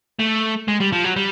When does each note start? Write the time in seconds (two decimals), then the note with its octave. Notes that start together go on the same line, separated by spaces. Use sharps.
0.20 A3
0.68 G#3
0.80 G3
0.92 F3
1.04 F#3
1.16 G3